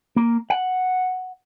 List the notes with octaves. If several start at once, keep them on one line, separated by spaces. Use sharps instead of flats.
A#3
F#5